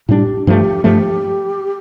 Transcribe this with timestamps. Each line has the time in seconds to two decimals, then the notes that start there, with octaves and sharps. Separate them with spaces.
0.09 A2 G3 D4 G4
0.47 G2 F3 A3 G4
0.84 G2 F3 A3 G4